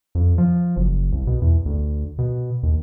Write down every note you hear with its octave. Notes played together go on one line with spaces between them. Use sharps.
F2
F3
F#1
C2
B2
E2
D2
B2
D#2